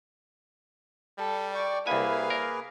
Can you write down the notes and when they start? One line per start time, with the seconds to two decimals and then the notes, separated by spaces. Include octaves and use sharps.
1.18 G3 A4
1.55 D5 G5 C#6
1.87 C2 A#3 E4 G#4 B4 F5 G#5
2.30 A#4